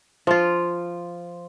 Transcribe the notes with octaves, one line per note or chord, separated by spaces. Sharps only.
F3 F4